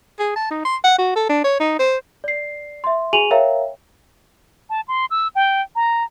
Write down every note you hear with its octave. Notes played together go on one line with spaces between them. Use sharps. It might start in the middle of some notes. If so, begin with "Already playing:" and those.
G#4
A5
D#4
C6
F#5
F#4
A4
D4
C#5
D#4
C5
D5 C7
E5 C6
F#4 G#4 G#5 D#7 F7 F#7
A#4 C#5 E5 F5 G5 A#5
A5
C6
E6
G5
A#5